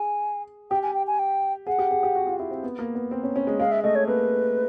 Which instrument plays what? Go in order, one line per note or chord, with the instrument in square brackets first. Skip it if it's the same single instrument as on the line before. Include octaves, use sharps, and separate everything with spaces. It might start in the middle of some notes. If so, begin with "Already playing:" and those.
Already playing: [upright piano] G#4 [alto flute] G#5
[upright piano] G4 [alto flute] G5
[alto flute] G#5
G5
G#5
G5
[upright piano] G#4 [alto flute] F#5
[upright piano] G4
G#4
G4
F#4
F4
E4
C4
B3
A#3
B3
C4
C#4
C#4
G#3
[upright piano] G#3 [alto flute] F5
[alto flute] E5
[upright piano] A3 [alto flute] D#5
[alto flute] C#5
[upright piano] A#3 [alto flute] B4